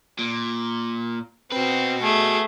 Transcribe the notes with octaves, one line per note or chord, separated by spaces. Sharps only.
A#2
C4 F#4 B4
A3 G#4